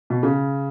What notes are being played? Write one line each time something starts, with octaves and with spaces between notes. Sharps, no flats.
B2
C#3